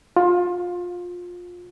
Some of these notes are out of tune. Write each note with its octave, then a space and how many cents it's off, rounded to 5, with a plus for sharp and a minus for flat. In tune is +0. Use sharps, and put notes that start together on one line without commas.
F4 +20